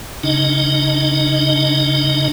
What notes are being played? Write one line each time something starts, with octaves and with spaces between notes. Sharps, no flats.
C#3 D4 D#4 D#5